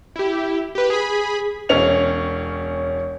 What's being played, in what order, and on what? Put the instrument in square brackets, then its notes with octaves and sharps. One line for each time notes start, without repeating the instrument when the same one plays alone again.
[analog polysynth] E4 G4
G4 B4
G#4 B5
[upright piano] E1 C#4 C#5 F7